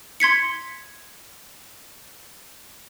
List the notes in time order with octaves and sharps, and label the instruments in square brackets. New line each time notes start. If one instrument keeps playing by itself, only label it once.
[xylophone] C6 G#6 B6 C#7